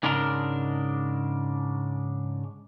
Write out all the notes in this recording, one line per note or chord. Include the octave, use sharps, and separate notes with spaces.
G#2 C#3 G#3 D4 A#4